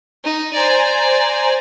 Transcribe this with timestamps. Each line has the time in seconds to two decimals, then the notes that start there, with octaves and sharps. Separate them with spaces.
0.24 D#4
0.53 C5 D5 G#5 A#5